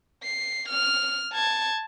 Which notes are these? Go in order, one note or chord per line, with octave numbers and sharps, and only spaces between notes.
C7
F6
A5 G#6